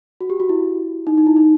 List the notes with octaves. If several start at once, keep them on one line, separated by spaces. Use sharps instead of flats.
F#4
G4
F#4
E4
D#4
D#4
E4
D#4